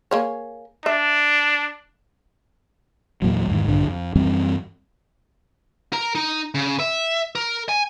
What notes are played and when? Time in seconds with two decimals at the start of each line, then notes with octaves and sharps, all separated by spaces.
0.11 A#3 G#4 C#5
0.86 D4 E5
3.22 E2 A#2 F#3
3.48 E2 G#2 D#3
3.67 A#1 G2 D3
3.87 F2
4.15 F#2 E3 G3 C4
5.93 A#4 A#5
6.15 D#4
6.55 C#3
6.80 E5
7.35 A#4
7.69 G#5